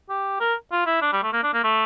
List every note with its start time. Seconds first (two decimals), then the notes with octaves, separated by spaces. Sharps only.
0.10 G4
0.40 A#4
0.72 F4
0.86 E4
1.02 D4
1.13 G3
1.23 A3
1.33 A#3
1.43 D4
1.54 A#3
1.64 A3